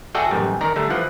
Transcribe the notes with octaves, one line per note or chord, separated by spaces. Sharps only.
F#4 G#4 A4 D5 E5 G5
A1 F#2 D#3 G3
D#3 A#4 D5 A#5
D3 G3 A3
E3 F3 F#5